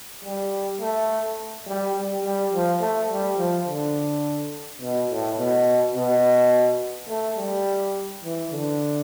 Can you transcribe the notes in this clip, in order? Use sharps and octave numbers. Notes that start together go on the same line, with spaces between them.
G3
A3
G3
G3
G3
F3
A3
G3
F3
D3
B2
A2
B2
B2
A3
G3
E3
D3